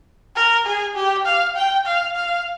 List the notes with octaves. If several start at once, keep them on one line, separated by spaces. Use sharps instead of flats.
A#4
G#4
G4
F5
G5
F5
F5